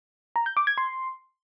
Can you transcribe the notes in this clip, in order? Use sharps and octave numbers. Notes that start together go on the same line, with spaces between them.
A#5
G6
D6
G#6
C6